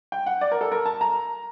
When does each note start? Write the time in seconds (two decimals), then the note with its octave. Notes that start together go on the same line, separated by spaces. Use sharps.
0.12 G5
0.26 F#5
0.41 D5
0.52 A#4
0.61 A4
0.72 A#4
0.86 A5
1.01 A#5